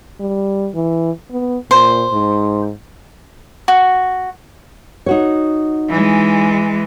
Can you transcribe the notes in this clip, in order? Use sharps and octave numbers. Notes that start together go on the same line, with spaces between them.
G3
E3
B3
A#2 C5
G#2
F#4
D#4 F#4 C#5
E3 G#3